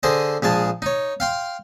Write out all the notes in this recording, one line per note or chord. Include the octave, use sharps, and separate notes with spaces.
D3 G#4 C5 D#5
A#1 G#3 G#4 A5
D#4 C#5
F5 G5 C6